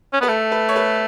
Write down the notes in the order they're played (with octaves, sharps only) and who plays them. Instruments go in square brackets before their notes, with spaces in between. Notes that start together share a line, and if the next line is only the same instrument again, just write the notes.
[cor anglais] C#4
[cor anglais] B3 [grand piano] B4
[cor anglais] A3 [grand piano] A4
[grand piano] B4
C#5
B4